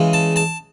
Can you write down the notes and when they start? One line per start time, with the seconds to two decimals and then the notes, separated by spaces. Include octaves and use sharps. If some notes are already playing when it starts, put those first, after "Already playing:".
Already playing: C#3 E3 G#3
0.13 A5
0.36 A5